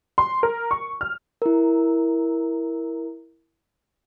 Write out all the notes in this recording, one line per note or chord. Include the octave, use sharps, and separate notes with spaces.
C6
A#4
C#6
F6
E4 A#4